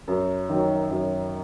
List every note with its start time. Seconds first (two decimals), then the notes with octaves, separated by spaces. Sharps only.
0.08 F#2
0.49 D#3 F#3
0.90 F#2